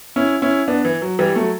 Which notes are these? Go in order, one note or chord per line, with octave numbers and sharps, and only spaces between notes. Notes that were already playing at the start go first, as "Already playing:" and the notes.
C#4 E4
C#4 E4
B3 D4
E3
F#3
E3 G3
F#3 A3